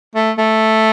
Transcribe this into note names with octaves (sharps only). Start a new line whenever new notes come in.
A3
A3